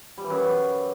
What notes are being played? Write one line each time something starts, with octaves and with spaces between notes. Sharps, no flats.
G3
E3
F#2